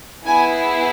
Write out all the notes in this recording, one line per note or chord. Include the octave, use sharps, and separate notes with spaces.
B3 E4 G#4 G#5